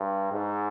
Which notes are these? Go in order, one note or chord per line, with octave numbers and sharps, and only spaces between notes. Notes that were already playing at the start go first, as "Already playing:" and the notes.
Already playing: G2
G#2